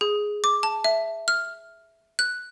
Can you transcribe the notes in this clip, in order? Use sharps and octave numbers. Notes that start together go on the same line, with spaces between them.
G#4
D6
A5
E5
F6
F#6